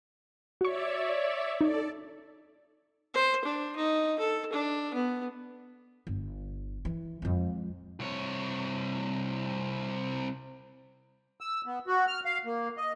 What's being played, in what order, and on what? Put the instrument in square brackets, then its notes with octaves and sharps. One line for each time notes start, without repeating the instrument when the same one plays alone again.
[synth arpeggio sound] F#4 C#6 [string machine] C#5 D5 E5
[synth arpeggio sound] D#4 [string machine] A4 D5
[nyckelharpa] C5
D4
D#4
A4
D4
B3
[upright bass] G1
E3
F2 G#3
[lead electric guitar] C2 C#5
[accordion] E6
B3
F#4
F6
F5
A#3
D#5